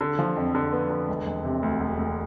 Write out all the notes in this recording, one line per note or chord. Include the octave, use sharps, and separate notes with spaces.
D3
F3
F2
D3
B3
D3
E1
E1
C3
D2
E1
D2